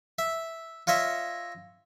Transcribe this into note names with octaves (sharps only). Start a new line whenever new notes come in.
E5
F4 C#5 D#5 E5